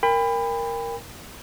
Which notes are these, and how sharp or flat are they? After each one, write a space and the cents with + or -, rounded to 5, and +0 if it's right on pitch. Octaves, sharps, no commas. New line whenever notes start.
A#4 +0 G5 +40 B5 +20